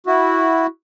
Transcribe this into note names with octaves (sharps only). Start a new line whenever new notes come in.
E4 F#4